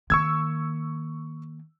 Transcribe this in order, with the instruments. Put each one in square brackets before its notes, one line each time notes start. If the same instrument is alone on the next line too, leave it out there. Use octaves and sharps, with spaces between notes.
[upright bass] D#3 A#3 [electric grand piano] C#6 E6 G#6